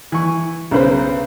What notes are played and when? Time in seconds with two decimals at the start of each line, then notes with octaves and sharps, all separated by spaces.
0.12 E3 C#6
0.71 B1 C#3 B4 C5